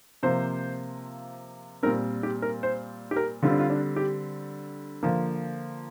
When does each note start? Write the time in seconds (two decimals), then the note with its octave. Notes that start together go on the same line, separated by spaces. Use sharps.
0.23 C3 F3 A#3 C5
1.83 A#2 G3 C4 A#4
2.23 G4
2.42 A#4
2.63 C5
3.11 G4
3.16 A#4
3.43 D3 G3 C4 F4
3.51 D4
3.59 F4
3.70 D4
3.96 G4
5.03 D3 F3 A#3